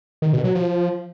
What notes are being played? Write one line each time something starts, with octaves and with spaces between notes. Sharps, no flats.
D#3
B2
F#3
F3